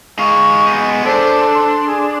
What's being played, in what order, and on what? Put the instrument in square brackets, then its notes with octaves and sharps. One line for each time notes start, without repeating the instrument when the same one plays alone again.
[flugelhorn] G#3 [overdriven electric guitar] D#4 F5 [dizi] C#6
[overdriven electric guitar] B3 D#4
[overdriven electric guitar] D4 [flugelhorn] A4 [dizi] C5
[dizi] C6
[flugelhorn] G#4